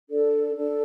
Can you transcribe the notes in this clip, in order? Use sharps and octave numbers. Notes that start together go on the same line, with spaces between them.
D4 A4 D5
D4 A4 D5